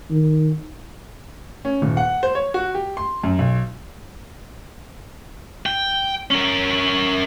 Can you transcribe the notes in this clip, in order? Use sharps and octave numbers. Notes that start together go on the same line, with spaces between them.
D#3
C#4
D#1
F#5
C5
C#5
F#4
G4
C6
F#2
B1
G5
C#4 A#4